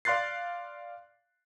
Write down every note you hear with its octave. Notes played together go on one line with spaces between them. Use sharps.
D5 F5 C6 F#6 A6 C7